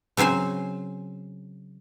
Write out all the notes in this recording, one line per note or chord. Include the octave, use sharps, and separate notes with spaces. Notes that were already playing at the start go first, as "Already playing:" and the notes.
C#3 F#3 C4 C5 G#5